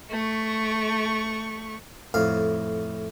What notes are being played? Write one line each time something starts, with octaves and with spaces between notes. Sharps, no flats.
A3 C#6
F2 A2 F5